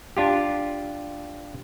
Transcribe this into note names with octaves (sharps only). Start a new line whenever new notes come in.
D4 F4 G4